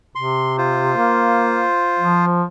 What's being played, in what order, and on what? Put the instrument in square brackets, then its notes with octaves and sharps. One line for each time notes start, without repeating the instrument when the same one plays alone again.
[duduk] C3 [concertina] C6
[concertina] F4 C5
[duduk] A#3
F3